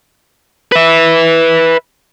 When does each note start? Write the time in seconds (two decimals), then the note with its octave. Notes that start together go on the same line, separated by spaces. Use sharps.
0.72 B4 E5